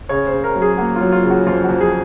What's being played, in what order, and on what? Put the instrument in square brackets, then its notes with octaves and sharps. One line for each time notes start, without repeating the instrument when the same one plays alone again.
[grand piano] C#3 C#5
C5
C#3
A#4
F#3
G#4
A#3 F#4
F4
F#3
F4
C#3
F#4
F2 F4
F#4
F2
G#4